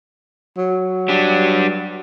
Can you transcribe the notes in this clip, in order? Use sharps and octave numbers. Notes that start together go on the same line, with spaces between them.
F#3
G3 D4